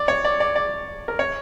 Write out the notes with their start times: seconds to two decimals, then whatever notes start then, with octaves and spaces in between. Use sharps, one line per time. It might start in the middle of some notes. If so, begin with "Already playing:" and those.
Already playing: D5
0.08 C#5
0.25 D5
0.40 D5
0.56 D5
1.08 A#4
1.19 C#5